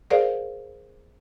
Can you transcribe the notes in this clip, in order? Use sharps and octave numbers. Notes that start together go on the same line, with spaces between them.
G#4 A#4 C5 D5 F5